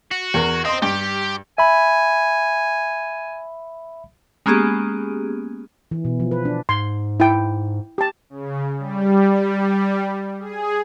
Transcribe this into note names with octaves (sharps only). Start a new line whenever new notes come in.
F#4
E2 A#4
C5 D#5 G5 C6
G2 G4
E5 G#5 B5
G#3 A#3 B3 C#4 G4 G#4
E3
B2
F3
B4
D4
G#2 C6
E4 G5
G4 A5
C#3
G3
G#4